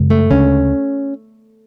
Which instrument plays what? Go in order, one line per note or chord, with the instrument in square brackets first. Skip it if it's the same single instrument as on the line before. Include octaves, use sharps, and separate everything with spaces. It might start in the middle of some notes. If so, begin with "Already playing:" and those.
Already playing: [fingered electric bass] F#2 C#3 G#3
[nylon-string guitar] A3
[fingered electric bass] D2 C#3 G#3 D4 [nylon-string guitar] C#4